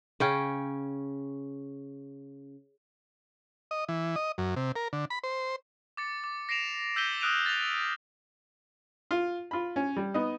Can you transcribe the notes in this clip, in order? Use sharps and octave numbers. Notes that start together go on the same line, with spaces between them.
C#3 C#4 G5
D#5
E3
D#5
F#2
C3
A#4
D3
B5
C5
D6 A6 C#7
D6
A#6 C7 D7 E7 F7
E6 G6 B6 D#7 G7
D#6 F6 F#6 D7 D#7 F7
A6 A#6 F7
F4
F4 B5
C#4
G3
B3 D#4